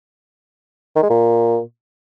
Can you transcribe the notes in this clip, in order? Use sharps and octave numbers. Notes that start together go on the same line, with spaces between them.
D#3
G#3
A#2